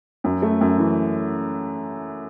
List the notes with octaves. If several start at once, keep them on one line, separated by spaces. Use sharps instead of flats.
F#2
A3
F#2
E3